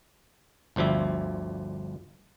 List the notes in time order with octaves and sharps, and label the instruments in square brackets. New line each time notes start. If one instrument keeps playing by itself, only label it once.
[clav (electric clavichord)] G1 D2 F3 G3 E5